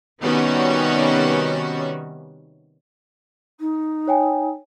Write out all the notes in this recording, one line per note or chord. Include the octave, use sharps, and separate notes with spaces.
C3 D#3 G3 B3 C#4 F#4
D#4
C#5 G5 G#5